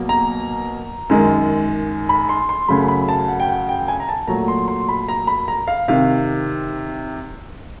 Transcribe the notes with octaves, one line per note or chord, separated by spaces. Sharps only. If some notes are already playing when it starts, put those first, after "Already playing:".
Already playing: B2 F#3 A#3
A#5
F#2 D#3 G#3
B5
C6
C6
F#2 C#3 F#3 A3 B5
B5
A5
F#5
G5
F#5
G5
G#5
A#5
A5
A#2 F#3 A3 A#5
C6
C6
B5
A#5
B5
A#5
F5
C3 D#3 F5